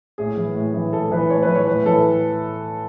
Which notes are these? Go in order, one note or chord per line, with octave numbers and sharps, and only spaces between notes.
A2 G#4
E3
A2
E3
A2 A4
E3 B4
A2 C#5
B4
E3
C#5
A2 B4
E3 A4